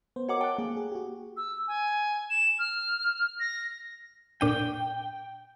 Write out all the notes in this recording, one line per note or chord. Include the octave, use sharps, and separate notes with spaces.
B3 C5
F#4 A#4 C#5 D#5 F#5 D6
G5 A5 F#6
A#3 G#4
G#4
F#4 G4
E6
G#5
E7
F6
A#6
A#2 D4 G5 D#7